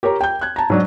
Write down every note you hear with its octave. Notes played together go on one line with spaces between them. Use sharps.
G4 A#4 C#5 A#5
G5 G6
F#6 G#6
A5 A#5
G#2 F#3 D4